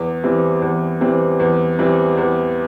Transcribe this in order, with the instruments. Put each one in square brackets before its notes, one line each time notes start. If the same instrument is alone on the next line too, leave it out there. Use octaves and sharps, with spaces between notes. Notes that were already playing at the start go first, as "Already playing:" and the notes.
Already playing: [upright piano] E2
E3 G3 C4
E2
E3 G3 C4
E2
E3 G3 C4
E2